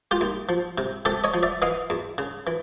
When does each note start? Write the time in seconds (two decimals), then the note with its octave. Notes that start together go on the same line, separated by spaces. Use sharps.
0.11 F4 G4
0.21 D#2
0.49 F3
0.78 C3
1.05 C3 G4 A4
1.24 C#5 D#5
1.34 F3
1.43 D5 E5
1.62 E3 D#5 F5
1.90 E2
2.18 C#3
2.47 E3